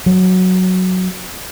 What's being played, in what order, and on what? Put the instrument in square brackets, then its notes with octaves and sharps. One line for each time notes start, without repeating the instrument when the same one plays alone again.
[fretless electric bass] F#3